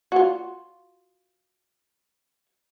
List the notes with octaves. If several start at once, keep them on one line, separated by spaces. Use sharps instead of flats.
F4 F#4